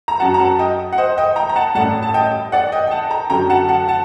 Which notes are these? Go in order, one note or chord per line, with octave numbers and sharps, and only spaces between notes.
A#5
F#2 F#3 F#5 A5
A#5
F#5 A5
D#5 G5
F#5
C5 D#5
D#5 G5
G5 A#5
A#5
F#5 A5
A1 A2 G3 F#5 A5
A5
D#5 G5
D5 F#5
D#5 G5
G5
F#5 A5
G5 A#5
F#2 D3 F#3 G5 A#5
F#5 A5
F#5 A5
F#5 A5